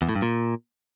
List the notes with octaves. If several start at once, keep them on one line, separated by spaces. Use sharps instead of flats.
E2
A2
G2
A#2